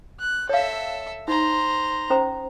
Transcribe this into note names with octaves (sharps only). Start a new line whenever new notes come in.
F#6
A4 C#5 E5 F5
D#4 C5 A#5
C#4 C5 A#5